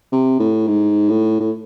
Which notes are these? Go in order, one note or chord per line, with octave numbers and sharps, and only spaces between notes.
C3
A2
G#2
A2
A2